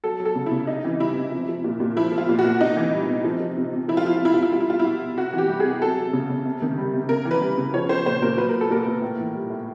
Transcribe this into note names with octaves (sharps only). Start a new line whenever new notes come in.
F#3 A4
F#3
A4
C#3
E4
C#3
C3 D#4
E3
G3 E4
C3
F3
F3
A#2
A#2
F3 E4
F3
F4
A#2
F#4
A#2
C3 D#4
E3
G3
C3
F3
F3
C3
C3
F3 E4
F4
F3 E4
F4
C3 E4
C3 F4
E4
G3 F4
E4
G3 F4
B2 E4
B2
C3 F#4
E3
G4
G3
G#4
C3
F#3 A4
F#3
C#3
C#3
C3
D#3
G3
C3
C#3 A#4
E3
B4
G3
C#3
F3 C#5
F3 C5
A#2 C5
A#2 A#4
F#3 B4
A#4
F#3
A4
A#2 A#4
A#2
A2
E3
G3
A2